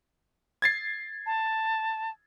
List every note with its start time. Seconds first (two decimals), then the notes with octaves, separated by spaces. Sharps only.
0.62 G#6 A6 C7
1.26 A5